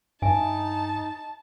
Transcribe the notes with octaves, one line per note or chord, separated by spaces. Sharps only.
G2 D#4 E5 G#5 A5